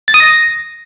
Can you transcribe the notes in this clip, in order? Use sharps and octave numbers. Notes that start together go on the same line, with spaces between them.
A6
D#6
A#6